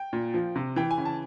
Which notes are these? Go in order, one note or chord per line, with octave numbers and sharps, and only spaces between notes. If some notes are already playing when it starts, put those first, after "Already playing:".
Already playing: G5
A#2
F3
C3
E3 G5
G#5
C#3
A5